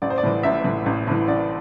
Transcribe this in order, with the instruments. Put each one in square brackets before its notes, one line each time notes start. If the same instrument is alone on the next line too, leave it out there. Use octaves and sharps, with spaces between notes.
[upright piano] A1 D5
C5
D5
A2 E3
A1 E5
A2 E3
A1
A2 E3
A1 D5